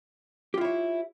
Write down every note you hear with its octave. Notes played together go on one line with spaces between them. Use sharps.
E4 F4 G4 C#5